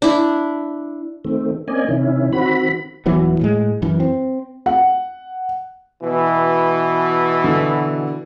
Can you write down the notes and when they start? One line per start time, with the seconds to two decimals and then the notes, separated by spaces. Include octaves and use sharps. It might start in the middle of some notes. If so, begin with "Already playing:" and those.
0.02 D4 E4
1.25 D#3 A3 C4
1.68 A#3 C4 C#4 D5 D#5 G#5
1.88 C3 D#3 C#4 E4
2.33 D#3 C4 F#4 B5
3.06 D#1 E3 F#3 B3
3.41 A2 G#3
3.82 F#2 E3
4.00 C4
4.66 F#5
6.02 B2 E3
7.44 D3